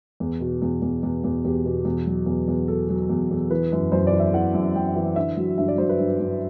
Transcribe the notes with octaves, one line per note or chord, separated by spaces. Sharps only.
E2
B2
E2
E2
E2
E2
E2 G4
B2
E2
F#3
E2
E2
F#3 A4
F#3
E2
E2
E3 B4
F#2
F#2 C5
D5
E3
E5
E3 F#5
F#2
F#2 G5
E3
D3 E5
F#3
G2 E5
D5
F#3 C5
B4
G2
G2